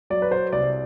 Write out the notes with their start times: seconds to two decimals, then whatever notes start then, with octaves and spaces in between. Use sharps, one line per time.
0.10 F#3 D5
0.22 B4
0.31 C5
0.53 C2 D5